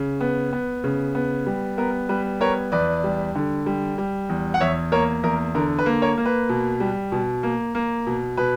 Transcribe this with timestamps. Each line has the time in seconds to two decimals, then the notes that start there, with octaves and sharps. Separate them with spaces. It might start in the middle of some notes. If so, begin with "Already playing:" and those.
Already playing: C#3
0.21 B3
0.53 B3
0.84 C#3
1.15 B3
1.46 G3
1.78 B3 A#4
2.09 G3 B4
2.40 B3 A#4 C#5
2.72 E2 B4 D5
3.04 G3
3.35 D3
3.66 G3
3.98 G3
4.29 E2
4.54 F#5
4.60 E2 C#5 E5
4.92 A#3 A#4 C#5
5.23 E2 A#4
5.55 D3 A#4
5.79 B4
5.86 A#3
6.02 A#4 C#5
6.18 A#3
6.25 B4
6.49 B2
6.80 G3
7.12 B2
7.43 A#3
7.75 A#3
8.07 B2
8.37 B2 B4